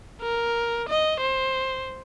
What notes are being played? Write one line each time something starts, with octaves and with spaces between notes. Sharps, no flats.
A#4
D#5
C5